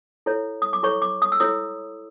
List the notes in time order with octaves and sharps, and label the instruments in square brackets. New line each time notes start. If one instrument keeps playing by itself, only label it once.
[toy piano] E4 A4 C#5
D#6
D6
E4 A4 C#5 C#6
D6
D#6
E6
E4 A4 C#5 D#6